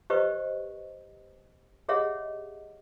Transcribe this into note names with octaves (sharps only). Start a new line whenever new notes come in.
G4 B4 C5 D#5 C#6
G4 G#4 C#5 D#5 E5 F#5